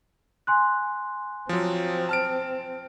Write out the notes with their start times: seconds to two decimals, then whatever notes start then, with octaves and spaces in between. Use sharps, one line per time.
0.47 G#5 C6 F#6
1.49 F3 F#3 C4
2.09 A5 F6 D7